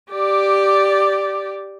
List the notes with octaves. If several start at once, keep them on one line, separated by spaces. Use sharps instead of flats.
G4 D5